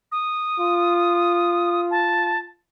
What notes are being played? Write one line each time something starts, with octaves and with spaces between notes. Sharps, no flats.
D#6
F4
A5